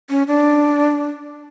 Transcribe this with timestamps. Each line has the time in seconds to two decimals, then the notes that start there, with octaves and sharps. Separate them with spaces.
0.10 C#4
0.28 D4